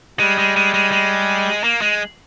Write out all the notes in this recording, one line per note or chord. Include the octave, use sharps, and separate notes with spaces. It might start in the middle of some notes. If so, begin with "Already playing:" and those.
G3 G#3
G#3
G#3
G#3
G#3
A#3
G#3